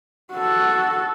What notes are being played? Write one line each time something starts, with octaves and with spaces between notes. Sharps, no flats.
F#4 A4